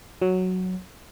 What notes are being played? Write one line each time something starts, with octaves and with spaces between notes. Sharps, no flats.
F#3